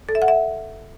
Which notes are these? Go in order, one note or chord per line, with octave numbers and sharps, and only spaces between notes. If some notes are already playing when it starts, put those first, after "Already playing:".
A4
E5
F#5
E5